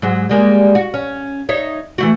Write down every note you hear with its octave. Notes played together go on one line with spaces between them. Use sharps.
G#2 F#3 G#3
G3 G#3 A#3
F#4
C#4
D#4 C#5 E5
E3 A3 F#4